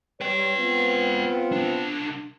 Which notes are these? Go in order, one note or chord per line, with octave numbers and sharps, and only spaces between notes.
G3 B4 C#5 G5
B3 C4 F4
C2 D4